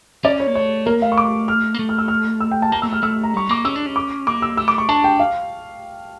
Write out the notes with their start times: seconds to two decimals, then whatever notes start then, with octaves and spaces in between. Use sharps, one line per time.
0.24 C#4 D5
0.40 C#5
0.47 A#3
0.55 A3 C#5
0.86 A#3 A#4
1.02 A3 F5
1.12 C#6
1.18 D6
1.48 F6
1.74 A#3
1.79 A3
1.89 F6
1.98 E6
2.08 F6
2.40 E6
2.51 G5
2.62 A5
2.72 A#3 A#5
2.82 A#3 E6
2.87 A3
2.93 F6
3.03 A3 E6
3.23 A#5
3.34 G3 C#6
3.49 A#3 D6
3.65 C#4 E6
3.76 D4
3.86 C#4
3.96 D6
4.27 A#3 D6
4.42 E6
4.57 A3 E6
4.68 D6
4.78 C#6
4.89 D4 A5
5.04 G5
5.19 F5